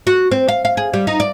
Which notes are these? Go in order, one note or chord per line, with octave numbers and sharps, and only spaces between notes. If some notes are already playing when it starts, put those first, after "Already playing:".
F#4
C4
F5
F5
G#4
G3
D#4
D5